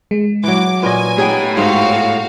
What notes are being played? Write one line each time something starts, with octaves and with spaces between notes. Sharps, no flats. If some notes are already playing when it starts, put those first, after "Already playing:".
G#3
E3 F#3 D6
A#2 C#4 B4 D#5 G#5
A2 B3 D#4 G4 G#4 C#5 G5
G#2 F#4 F5